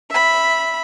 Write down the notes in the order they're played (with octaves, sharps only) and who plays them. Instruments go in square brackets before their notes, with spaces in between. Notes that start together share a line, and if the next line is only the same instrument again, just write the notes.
[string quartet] E5 B5